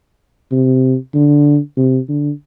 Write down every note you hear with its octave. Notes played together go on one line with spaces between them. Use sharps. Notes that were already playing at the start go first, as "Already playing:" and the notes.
C3
D3
C3
D3